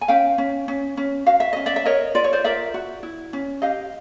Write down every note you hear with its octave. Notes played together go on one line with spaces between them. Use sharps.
G#5
C#4 F5 G5
C#4
C#4
C#4
F#4 F5
E5
C#4 D#5
D5 E5
E5
A#4 C#5 D#5
F4 D5
C#5
C5 D5
A#4 D5 E5
F#4
E4
C#4
G4 D#5 F5